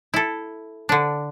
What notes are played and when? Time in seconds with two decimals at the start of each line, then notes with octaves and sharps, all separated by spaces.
0.14 E4 A4
0.89 D3 D4